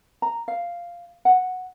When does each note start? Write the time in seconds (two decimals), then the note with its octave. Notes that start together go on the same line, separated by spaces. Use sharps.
0.22 A#5
0.48 F5
1.25 F#5